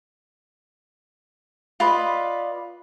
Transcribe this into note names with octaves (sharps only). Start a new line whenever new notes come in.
F4 B4 D5 D#5